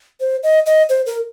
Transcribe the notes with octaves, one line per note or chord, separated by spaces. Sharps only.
C5
D#5
D#5
C5
A#4